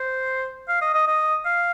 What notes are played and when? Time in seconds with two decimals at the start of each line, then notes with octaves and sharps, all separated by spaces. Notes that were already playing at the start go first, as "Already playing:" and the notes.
Already playing: C5
0.68 F5
0.81 D#5
0.94 D#5
1.07 D#5
1.45 F5